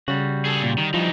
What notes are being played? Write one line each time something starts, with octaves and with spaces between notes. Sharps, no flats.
C#3 G3 F#4
G#4 A4
A#2
D#3
E3 F3 D#4